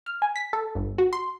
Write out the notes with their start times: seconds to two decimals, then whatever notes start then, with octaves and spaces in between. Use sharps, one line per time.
0.06 F6
0.22 G#5
0.36 B6
0.53 A4
0.75 G1
0.98 F#4
1.13 C6